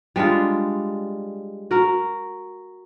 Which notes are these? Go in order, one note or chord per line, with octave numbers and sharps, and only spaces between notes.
G3 G#3 D4 F4
F#4 A#4